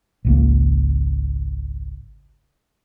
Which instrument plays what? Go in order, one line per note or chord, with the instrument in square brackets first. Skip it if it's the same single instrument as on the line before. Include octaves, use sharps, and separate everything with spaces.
[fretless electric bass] G#1 C#2 A#3